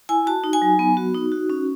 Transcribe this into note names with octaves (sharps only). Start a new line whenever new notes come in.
E4 G#5
F#4 A5
D#4
G#5
F#3
B3
F#4
D#4
F#4
C#4